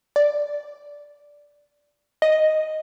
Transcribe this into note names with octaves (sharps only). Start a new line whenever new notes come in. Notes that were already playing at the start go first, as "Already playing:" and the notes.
D5
D#5